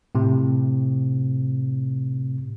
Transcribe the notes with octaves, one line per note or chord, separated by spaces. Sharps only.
A2 C3